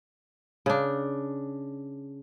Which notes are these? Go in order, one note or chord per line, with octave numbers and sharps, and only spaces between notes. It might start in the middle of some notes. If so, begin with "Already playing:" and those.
C#3 D4